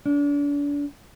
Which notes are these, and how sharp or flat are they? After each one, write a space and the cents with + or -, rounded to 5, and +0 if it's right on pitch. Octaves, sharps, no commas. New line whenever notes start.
D4 -35